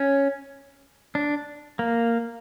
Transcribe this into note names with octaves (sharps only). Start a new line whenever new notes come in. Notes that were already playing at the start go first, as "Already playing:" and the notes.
Already playing: C#4
D4
A#3